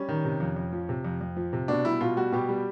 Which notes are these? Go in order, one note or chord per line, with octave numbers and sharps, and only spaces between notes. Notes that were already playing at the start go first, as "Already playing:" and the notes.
Already playing: G3 C#4
D#3
C3
F2
F2
F3
C3
F2
F2
F3
C3
B2 D4
G3 E4
B2 F4
G3 F#4
B2 G4
G3